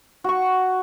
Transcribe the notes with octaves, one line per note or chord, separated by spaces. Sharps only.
F#4 C#6